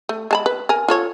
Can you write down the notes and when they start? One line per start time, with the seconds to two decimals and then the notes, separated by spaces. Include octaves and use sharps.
0.09 A3
0.31 G#3 A5 B5
0.46 B4
0.69 A#4 G#5
0.88 F4 A4 C#5